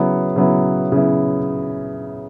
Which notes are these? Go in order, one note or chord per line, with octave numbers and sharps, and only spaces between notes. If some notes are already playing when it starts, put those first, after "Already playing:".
Already playing: C#3 F#3 B3 E4
C#3 F#3 B3 E4
C#3 F#3 B3 E4